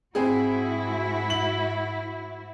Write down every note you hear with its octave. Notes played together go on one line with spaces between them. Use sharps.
G#2 C4 E4 F#4 G#4
F#7